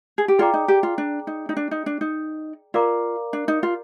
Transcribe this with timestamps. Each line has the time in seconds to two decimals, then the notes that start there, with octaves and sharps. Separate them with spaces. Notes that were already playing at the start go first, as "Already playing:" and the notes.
0.18 G#4
0.28 G4
0.39 F4 G#4 D5 G5 A#5 D6
0.54 D#4
0.68 G4
0.83 F4
0.98 D4
1.27 D#4
1.49 D#4
1.57 D4
1.71 D#4
1.86 D4
2.01 D#4
2.74 F4 A#4 D5 F5 A#5 D6
3.33 D4
3.48 D#4
3.63 F4